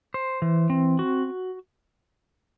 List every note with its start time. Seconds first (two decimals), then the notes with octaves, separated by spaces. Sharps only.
0.14 C5
0.42 E3
0.70 C4
0.99 F#4